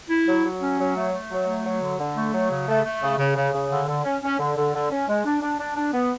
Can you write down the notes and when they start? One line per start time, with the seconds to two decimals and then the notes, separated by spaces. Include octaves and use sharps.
0.10 E4
0.27 F#3
0.44 F#3
0.61 C#4
0.79 F#3
0.96 A3
1.13 A3
1.31 F#3
1.48 A3
1.65 F#3
1.82 D3
1.99 D3
2.16 A3
2.33 F#3
2.50 C#3
2.68 A3
2.85 A3
3.01 C#3
3.19 C#3
3.36 C#3
3.53 C#3
3.70 D3
3.88 D3
4.04 C#4
4.22 C#4
4.39 D3
4.57 D3
4.74 D3
4.91 C#4
5.08 G#3
5.25 D4
5.42 D4
5.60 D4
5.76 D4
5.93 B3